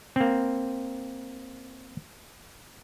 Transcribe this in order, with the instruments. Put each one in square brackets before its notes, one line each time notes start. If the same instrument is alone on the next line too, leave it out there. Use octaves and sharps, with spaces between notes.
[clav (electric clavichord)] A#3 C4